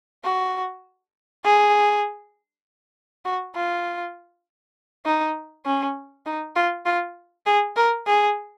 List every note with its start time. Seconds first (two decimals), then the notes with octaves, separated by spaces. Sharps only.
0.24 F#4
1.44 G#4
3.25 F#4
3.55 F4
5.06 D#4
5.66 C#4
6.26 D#4
6.56 F4
6.86 F4
7.46 G#4
7.76 A#4
8.07 G#4